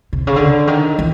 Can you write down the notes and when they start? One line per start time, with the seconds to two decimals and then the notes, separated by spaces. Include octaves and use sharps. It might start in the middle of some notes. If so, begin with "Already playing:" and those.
0.13 C3
0.27 C#3
0.36 D3
0.67 D#3
0.99 E3